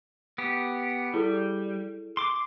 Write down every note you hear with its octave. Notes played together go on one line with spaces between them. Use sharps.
B3 G4
G3 E4 G#4 A4
C6 D6